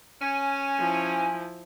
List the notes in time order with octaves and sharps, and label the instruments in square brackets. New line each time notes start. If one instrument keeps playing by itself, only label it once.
[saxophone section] C#4 [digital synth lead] G#5
[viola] F3 E4